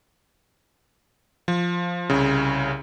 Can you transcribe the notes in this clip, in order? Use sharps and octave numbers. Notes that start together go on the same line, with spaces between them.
F3
C2 C#3